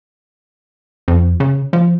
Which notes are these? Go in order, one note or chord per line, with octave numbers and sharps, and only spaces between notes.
F2
C#3
F3